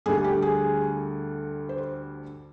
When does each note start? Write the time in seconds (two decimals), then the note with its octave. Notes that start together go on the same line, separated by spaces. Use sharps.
0.06 D2 D3 G3 G#4
0.24 G4
0.42 G#4
1.69 C5